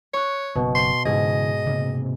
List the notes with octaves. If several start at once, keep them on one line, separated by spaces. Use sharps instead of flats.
C#5 C#6 F#6
F#1 B2
C6
G#2 C#3 E3 G#4 D#5 G#6
C3 A#3 C4